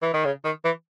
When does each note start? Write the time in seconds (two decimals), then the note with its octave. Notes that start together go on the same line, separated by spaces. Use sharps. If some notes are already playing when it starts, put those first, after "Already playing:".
0.02 E3
0.14 D#3
0.25 C#3
0.44 D#3
0.64 E3